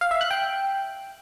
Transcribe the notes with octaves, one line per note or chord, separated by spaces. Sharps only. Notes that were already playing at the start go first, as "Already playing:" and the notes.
F5
E5
F#6
G5